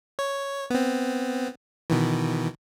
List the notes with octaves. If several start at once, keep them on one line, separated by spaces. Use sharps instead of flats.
C#5
B3 C4
B2 D#3 E3